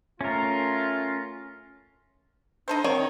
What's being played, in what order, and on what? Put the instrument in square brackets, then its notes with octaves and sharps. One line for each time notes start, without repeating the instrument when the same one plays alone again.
[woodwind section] A3 F4 [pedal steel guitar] C#4 A#4
[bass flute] D4 [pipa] D#4 A4 C5
[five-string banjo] D#3 [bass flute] C4 [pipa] C#5